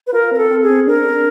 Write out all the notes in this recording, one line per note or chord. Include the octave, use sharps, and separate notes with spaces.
B4
F4 A#4
C4 A#4
A4
C4
G#4
C4
D4 A#4